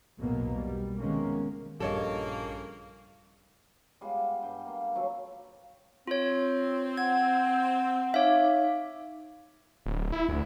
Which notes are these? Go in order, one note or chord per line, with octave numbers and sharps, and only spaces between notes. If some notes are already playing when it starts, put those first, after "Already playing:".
B1 E2 B2 F#3 A#3 B3
G3
C3 D#3 G#3 A#3 B3 C#4
A#1 G2 C#3 F3 A#3 A4 C#5 D#5
G3 G#3 B3 F4
G2 G5
A#3
F3 F#3 C#4 A4
C4 F4 C#5
F#5 G#6
D#4 C#5 E5 F5 D6
D1
E4
D2